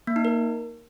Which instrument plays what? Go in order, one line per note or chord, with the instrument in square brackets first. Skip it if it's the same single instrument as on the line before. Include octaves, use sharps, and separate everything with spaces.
[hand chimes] A#3
D#4
A#4